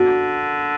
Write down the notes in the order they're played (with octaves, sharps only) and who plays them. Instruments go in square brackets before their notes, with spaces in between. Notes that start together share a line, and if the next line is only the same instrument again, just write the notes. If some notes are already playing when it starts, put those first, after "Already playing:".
Already playing: [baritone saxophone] D3 [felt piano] F#4